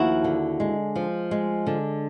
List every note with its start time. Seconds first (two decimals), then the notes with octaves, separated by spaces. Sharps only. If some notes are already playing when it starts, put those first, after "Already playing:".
Already playing: D#2 F3 E4 F#4
0.24 D3
0.60 G#3
0.96 F3
1.31 G#3
1.67 D3